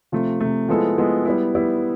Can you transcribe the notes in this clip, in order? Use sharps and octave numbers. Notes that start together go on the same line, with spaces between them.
C3 F3 A3
C3 F3 A3
F3 G#3 B3 E4 A4
F3 G#3 B3 E4 A4
G3 B3 E4
G3 B3 E4